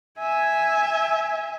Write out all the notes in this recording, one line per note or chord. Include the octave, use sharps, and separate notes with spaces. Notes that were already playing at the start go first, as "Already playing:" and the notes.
E5 G#5